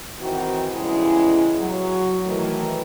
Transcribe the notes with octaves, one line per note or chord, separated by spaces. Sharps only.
D#3 E3 C4 F#4
E2 C#3 G3 G#3 E4
F#3
D#3 E3 A3